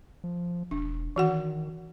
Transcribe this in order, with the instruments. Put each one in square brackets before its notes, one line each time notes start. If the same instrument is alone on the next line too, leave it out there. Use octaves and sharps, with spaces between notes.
[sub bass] F3
[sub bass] E1 [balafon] D4
[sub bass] D#3 [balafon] E3 F#4 F#5